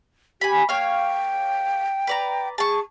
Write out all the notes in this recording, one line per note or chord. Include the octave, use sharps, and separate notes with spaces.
G4 G#5 B5
A#3 C#5 F5 G5
B4 D5 A#5
G#4 A5 C#6